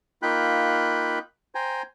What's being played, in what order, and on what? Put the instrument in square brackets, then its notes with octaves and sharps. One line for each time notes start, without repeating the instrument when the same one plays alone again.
[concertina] A#3 D#4 F4 G5 B5 F#6
C5 G5 G#5 A#5